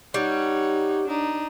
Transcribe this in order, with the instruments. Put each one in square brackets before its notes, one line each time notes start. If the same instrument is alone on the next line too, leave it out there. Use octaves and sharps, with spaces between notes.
[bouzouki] G3 [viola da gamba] D#4 [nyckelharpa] C#5 F#5
[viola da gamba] D4 [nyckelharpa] D#4